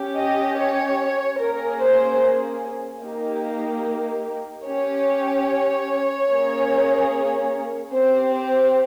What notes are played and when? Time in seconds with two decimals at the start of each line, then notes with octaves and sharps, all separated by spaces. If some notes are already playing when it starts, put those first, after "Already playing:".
Already playing: C#4 G4
0.17 D#5
0.58 C#5
1.40 A#3 C#4 G#4 A#4
1.81 C5
3.03 A#3 D#4 G4
4.66 C#4 G4 C#5
6.30 A#3 C#4 G#4
7.93 C4 G4 C5
8.34 C5